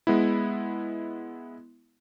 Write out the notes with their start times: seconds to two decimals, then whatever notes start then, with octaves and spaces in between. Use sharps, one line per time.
0.07 G#3 B3 E4